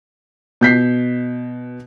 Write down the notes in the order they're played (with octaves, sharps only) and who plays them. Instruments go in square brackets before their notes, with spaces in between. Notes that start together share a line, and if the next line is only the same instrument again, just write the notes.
[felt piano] B2 G6 B6 C7